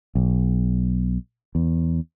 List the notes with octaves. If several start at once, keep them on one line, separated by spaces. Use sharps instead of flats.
B1
E2